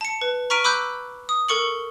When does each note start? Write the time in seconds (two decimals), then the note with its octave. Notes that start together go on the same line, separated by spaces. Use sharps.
0.01 A5 C#7
0.21 B4
0.50 A#5 C#6 F6 B6 D7 D#7
0.64 B5 D6 E6 F#6 G6
1.29 D#6
1.48 A4 A#4 C#6 C#7 F#7